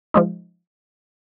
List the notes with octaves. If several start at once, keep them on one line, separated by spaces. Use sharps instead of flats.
F3 G#3 D#4